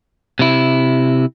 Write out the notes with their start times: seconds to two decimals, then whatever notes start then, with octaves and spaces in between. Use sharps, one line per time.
0.39 C3 E4